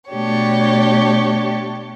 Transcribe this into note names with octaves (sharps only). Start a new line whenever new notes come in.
B2 A3 D4 G4 C#5